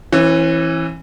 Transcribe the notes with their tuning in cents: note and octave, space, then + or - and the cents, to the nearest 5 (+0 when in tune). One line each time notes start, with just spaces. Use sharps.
E3 +0 C#4 -40